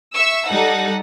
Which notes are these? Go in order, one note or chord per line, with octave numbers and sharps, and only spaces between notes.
E5 C#6 E6
G3 D#4 A4 F#5